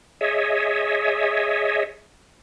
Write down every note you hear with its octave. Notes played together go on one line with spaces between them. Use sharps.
G#4 C#5 D#5 E5